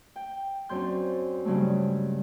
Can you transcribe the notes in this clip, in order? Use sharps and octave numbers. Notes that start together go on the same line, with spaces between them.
G5
F#2 C4 D4 C6 G6
G2 C#3 F#3 G#3 A3